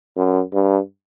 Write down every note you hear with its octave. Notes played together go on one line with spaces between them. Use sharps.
F#2
G2